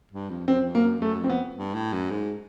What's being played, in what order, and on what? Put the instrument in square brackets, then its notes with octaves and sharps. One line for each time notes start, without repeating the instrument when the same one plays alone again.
[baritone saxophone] G2
F2
[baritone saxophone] F2 [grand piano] C4
[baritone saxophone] F#2
F2
[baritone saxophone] F#2 [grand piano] A#3
[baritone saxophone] F2
[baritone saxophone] F#2 [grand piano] A3
[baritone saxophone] F2 [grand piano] C4
[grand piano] B3
[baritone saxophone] G2
A2
F#2
G#2